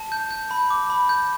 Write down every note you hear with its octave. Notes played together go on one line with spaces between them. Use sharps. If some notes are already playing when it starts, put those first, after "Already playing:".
Already playing: A5
G6
G6
B5
D6
B5
G6